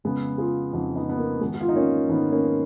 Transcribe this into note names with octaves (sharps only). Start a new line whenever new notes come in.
F2 C#3 G#3 B3
F4 G#4
F2 C#3 D#4 F#4
B3 D#4
B3
A#3
G#2 D#3 G#3 B3
F#4
F4
D#4
A#3 C#4
G#2 D#3 B3 D#4
A#3 C#4